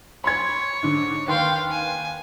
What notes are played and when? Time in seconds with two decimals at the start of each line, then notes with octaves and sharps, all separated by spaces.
0.24 C#5 B5 C6 G#6
0.83 G#2 D3
1.28 D#2 B4 F5 G5 C6
1.70 G#5